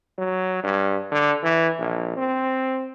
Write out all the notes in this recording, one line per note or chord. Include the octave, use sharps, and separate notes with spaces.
F#3
G2
D3
E3
A#1
C4